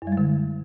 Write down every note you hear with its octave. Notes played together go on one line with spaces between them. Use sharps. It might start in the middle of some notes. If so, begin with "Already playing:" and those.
F#2
G3
G#3
D3